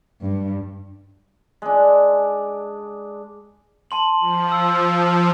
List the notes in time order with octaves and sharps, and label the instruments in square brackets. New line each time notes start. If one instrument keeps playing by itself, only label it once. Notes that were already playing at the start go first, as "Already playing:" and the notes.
[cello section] G2
[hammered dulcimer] G#3 D4
[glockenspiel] A5 C6 F#7
[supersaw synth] F3
[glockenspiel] E6